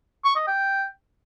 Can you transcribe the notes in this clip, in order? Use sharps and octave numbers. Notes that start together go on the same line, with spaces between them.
C#6
D#5
G5